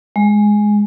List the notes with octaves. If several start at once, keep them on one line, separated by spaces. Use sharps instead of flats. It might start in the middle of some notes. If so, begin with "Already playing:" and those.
G#3